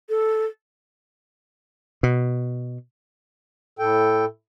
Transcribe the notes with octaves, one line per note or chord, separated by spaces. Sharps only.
A4
B2
A2 A4 G5